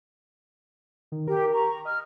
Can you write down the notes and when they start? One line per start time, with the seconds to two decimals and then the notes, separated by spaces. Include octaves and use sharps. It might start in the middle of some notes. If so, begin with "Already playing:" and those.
1.12 D#3
1.28 G4 A#4
1.52 A#5 C#6
1.85 D#5 F6